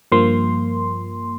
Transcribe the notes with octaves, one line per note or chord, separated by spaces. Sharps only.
G2 F3 A#3 C6